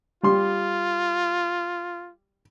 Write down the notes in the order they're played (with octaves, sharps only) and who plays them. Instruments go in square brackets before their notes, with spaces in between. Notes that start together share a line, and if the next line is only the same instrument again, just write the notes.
[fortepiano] G3 C6 [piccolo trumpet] F4